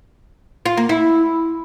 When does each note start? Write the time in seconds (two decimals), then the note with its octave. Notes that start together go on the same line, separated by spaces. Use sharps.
0.66 F4
0.77 A#3
0.89 E4